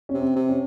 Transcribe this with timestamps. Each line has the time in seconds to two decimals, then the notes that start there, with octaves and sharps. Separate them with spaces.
0.09 C3 C#4
0.21 C4
0.36 C3
0.49 C#4